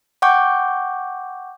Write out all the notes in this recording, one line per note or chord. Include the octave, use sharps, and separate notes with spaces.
F#5 G5 C#6 D6 G6